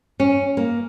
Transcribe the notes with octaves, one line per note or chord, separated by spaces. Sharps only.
C#4
A#3